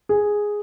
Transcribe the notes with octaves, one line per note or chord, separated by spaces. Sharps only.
G#4